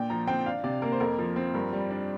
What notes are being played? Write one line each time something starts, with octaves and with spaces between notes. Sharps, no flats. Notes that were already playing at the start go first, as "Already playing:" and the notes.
Already playing: A#2 D4 G5
F3 A#5
C4 G5
D4 F5
C3 D5
A#3 A#4
C5
F2 A#4
F3
C4
G2 A#4
G3
D4